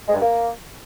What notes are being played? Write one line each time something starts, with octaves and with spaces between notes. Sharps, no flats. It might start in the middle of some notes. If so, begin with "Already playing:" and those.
G#3
G2
A#3